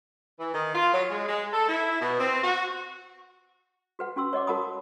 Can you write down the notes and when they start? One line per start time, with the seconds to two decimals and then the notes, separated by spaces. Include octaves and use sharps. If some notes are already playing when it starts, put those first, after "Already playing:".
0.39 E3
0.54 D#3
0.74 F4
0.93 F#3
1.10 G#3
1.28 G#3
1.53 A4
1.68 E4
2.01 B2
2.20 C4
2.43 F#4
3.99 F#4 B4 F#5
4.16 C#4 F#4 C6 E6
4.33 C#5 D#5 F#5 D6
4.47 F#4 A#4 F#5 A5 B5 D#6